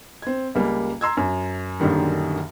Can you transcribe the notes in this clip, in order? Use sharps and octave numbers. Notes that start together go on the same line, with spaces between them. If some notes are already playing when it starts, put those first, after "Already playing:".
C4 G#6
C#2 G3 A#3
A#5 C6 E6 G#6
F#2
A#1 F#2 D3 D#3 G3